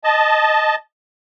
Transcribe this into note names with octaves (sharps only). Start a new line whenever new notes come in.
D#5 A5